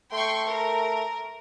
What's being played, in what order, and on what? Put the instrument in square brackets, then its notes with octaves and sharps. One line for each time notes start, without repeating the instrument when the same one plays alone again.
[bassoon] A3 [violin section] G5 C6 C#6
[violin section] A#4